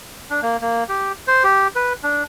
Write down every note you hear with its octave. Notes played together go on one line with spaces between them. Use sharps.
D4
A#3
A#3
G4
C5
G4
B4
D4